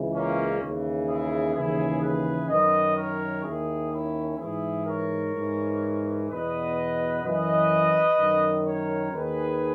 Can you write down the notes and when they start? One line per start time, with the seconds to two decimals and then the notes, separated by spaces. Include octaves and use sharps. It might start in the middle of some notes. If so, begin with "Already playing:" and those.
Already playing: C#2 C#3 E3
0.12 A#3 C#4
0.60 D#2 C#3 E3
1.07 E4 G#4
1.54 D#2 C#3 E3 E4 G#4
2.01 G#4 B4
2.49 F#2 D#3 B4 D#5
2.96 A#4 C#5
3.44 D#2 D#3 E4 G#4
3.92 C#4 E4
4.38 G#2 E3 E4 G#4
4.86 A#4 C#5
5.33 G#2 E3
6.28 E2 B2 B4 D#5
7.23 F#2 E3 B4 D#5
8.18 F#2 D#3
8.66 A#4 C#5
9.13 D#2 D#3 G#4 B4